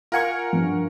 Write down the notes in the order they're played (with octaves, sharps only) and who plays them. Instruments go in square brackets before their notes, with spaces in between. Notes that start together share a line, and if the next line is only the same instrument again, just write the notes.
[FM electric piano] F4 G#5 C#6 [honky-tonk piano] A#4 F#5 C#7
[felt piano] G2 F3